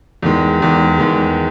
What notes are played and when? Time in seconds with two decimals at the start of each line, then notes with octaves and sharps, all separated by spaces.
0.22 E2 D#3 G#3
0.61 E2 D#3 G#3
0.98 E2 D#3 G#3